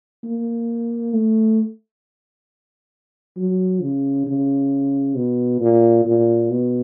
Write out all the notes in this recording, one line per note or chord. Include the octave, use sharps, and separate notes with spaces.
A#3
A3
F#3
C#3
C#3
B2
A#2
A#2
B2